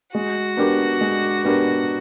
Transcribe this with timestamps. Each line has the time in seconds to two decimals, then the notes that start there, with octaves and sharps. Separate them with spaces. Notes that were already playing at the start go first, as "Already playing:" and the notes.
0.14 G#3 F#4
0.57 B3 D4 G4 A#4
1.01 G#3
1.44 B3 D4 G4 A#4